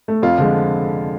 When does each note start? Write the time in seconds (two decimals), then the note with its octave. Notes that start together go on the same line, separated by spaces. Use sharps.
0.08 A3
0.22 F2 F4
0.38 D3 F3 G#3